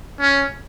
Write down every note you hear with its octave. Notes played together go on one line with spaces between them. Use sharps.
C#4